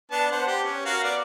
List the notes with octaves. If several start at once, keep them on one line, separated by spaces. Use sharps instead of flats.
B3 D4 A5
B3 C5 F#5
G4
C#4
F#4 A#4 F5
B3 D5